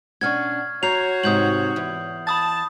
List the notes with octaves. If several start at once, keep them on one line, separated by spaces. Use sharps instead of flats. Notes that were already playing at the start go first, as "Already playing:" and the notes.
B2 C#4 D4 C#6 F6 G#6
F#4 C#5 A#5 G6 C7 F7
G#2 C3 D#6 G6 F#7
E2
A5 B5 D#6 A6